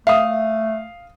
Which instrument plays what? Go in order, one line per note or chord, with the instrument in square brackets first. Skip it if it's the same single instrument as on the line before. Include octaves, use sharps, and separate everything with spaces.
[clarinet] A3 [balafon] E5 [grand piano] F5 D#6